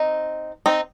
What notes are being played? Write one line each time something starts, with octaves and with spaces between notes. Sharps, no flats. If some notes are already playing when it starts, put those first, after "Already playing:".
Already playing: C4 D#4
C4 D#4